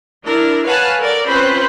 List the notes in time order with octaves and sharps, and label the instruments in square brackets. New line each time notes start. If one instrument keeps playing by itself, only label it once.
[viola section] D4 E4 A#4
B4 C#5 F5 F#5 G#5 A5
A4 A#4 D5
C4 C#4 F4 B4 C5 B5